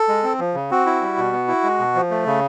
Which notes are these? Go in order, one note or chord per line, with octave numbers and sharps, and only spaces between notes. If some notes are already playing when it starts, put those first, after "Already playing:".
Already playing: A4
G#3
C4
F3
C#3
C4 F#4
E4
G3
B2
B3
E4
G#3
B2
F3
A3
C#3